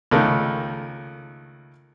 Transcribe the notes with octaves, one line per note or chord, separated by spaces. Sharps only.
C#2 D#3 A3